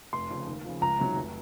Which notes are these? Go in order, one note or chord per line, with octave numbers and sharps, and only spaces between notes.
F1 C6
F2 C#3
D#2
C#3 F3
C#2 A#5
C3 D#3 F#3
F1